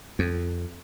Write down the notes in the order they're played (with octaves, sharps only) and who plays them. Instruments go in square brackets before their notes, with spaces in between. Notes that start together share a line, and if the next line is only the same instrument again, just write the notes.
[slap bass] F2